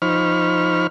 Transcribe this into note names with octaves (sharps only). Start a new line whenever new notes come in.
F3 D#4 C5 B5 C#6 F6